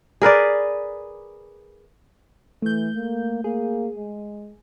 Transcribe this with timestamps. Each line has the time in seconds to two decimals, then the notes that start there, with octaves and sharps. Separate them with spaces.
0.22 G#4 A#4 B4 D5
2.62 E3 A3 G6
2.96 A#3
3.44 A#3 G#4
3.96 G#3